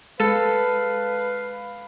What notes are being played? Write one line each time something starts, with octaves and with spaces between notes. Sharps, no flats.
G#3 A4 B4 F5